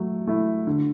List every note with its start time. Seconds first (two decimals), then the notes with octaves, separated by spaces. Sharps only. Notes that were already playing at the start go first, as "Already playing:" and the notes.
Already playing: F#3 A3
0.27 A3 E4
0.67 D3